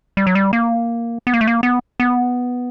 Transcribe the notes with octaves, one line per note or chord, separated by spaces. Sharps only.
G3
F#3
G3
A#3
B3
A#3
A3
A#3
B3
B3